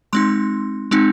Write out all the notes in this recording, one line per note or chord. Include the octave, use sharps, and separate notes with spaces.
G#3 C4 D#4 C6
G#3 C4 D#4